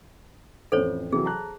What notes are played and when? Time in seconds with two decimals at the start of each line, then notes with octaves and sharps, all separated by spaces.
0.72 A1 F2 A4 C5 C#5
1.12 C3 E3 F#3 G#4
1.25 A5 A#5 F#6